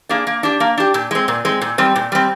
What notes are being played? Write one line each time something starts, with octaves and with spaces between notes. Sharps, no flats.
A#3 D4 G#4
A#3
D4 G4
A#3
D4 G4
A#2
G#3 C4
A#2
G#3 C4
A#2
G3 C4
A#2
G3 C4